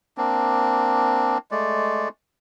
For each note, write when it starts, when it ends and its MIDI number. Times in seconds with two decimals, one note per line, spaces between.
0.18 1.38 58
0.18 1.38 60
0.18 1.38 62
1.51 2.08 56
1.51 2.08 57
1.51 2.08 74